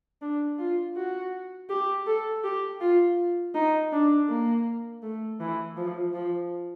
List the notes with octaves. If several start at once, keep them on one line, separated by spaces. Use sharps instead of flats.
D4
F4
F#4
G4
A4
G4
F4
D#4
D4
A#3
A3
E3
F3
F3